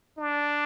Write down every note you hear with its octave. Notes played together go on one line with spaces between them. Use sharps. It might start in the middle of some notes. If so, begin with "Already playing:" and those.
D4